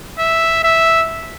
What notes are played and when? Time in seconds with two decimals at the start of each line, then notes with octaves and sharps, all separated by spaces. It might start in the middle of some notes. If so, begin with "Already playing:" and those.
0.19 E5
0.64 E5